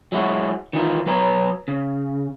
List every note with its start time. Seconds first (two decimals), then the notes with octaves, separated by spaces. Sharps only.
0.12 F#3 G#3 E4 F#4
0.73 D#3 E3 D#4 F4
1.06 F#3 B4 C#5 A#5
1.68 C#3